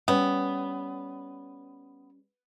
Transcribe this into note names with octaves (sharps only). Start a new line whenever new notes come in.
G3 B3 C#4